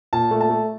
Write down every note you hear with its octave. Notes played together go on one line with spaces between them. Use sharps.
A#2 A5
A3
A5
A3